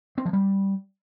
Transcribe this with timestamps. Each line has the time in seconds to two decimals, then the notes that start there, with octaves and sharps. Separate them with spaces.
0.18 C4
0.25 F3
0.33 G3